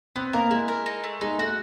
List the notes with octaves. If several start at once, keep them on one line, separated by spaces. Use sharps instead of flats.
B3 C4
A#3 A#4
G#3 E4
A#4
D#4
A3
G#3 D#4
A3 F#4